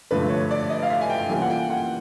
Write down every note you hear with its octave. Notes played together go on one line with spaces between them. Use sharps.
G2 D3 F3 A3 B4
C#5
D5
D#5
F5
E5
G#5
G5
E3 G3 A#3 C#4 F4 G#5
F#5
G5
F#5